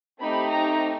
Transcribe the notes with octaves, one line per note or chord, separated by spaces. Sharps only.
A3 C4 D#4 G4 B5
A#5